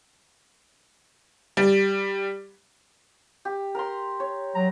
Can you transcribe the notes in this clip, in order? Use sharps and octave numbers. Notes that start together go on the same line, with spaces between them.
G3
G4
A#4 A#5 C6
C#5
F#3 A#5